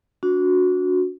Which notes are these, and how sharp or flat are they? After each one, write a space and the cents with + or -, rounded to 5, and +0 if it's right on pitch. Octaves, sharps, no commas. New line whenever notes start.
D4 -35 F#4 -20